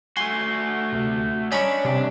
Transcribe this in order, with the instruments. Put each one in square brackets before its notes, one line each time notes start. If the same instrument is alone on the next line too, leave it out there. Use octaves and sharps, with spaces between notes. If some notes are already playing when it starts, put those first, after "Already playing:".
[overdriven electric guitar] A3 F#4 [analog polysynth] G#5 [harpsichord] C6
[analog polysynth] D2 C3
[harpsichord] C#4 C#5 B5 [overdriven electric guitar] D4 [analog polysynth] D#5 A#5 C#6
[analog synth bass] C3 [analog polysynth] G3